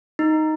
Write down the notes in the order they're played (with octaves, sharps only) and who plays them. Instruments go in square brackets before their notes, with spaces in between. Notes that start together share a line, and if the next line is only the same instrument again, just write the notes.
[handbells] D#4